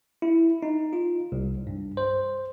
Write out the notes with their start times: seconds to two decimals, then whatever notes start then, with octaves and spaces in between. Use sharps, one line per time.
0.22 E4
0.63 D#4
0.93 F4
1.32 C2
1.67 G2
1.97 C5